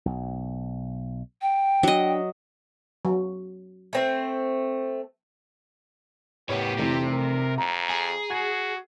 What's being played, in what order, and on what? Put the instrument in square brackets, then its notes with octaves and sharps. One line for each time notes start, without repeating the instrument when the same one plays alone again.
[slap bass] B1
[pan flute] G5
[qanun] F#3 D#5 [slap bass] D4
[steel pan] F#3
[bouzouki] A3 C4 E5
[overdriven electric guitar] A2 B3 [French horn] G4 [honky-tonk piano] C#5
[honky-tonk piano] F1 E3 [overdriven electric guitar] C3
[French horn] A#4
[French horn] F2 [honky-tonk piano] A#5
[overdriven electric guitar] G#4
[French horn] F#4 [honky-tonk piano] G#6